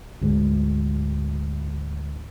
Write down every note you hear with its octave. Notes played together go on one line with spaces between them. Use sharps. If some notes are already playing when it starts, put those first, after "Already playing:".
D2 G#2